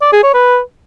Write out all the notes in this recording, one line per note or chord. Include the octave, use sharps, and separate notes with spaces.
D5
G#4
C#5
B4